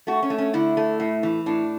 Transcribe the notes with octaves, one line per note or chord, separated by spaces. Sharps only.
A3 F#4
C#4
A3
C#4
D3 E4
A3
A2
E3
A2 D4